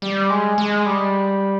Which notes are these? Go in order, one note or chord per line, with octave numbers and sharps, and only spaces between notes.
G3
G#3
G#3
G3